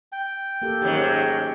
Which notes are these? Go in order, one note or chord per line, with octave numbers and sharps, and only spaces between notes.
G5
A#3 G4 A4
G#2 D#3 F#3 C#4 G4